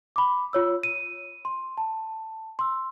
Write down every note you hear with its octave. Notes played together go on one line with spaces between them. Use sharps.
B5 D6
F4 C#5 E6
D#7
C6
A5
C6 E6